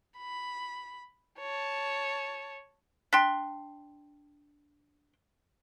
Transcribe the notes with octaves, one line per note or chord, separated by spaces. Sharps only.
B5
C#5 A5
D4 G5 C6 B6